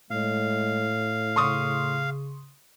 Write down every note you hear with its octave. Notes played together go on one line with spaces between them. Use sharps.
A2 G#3 F5
C#3 C6 C#6 D#6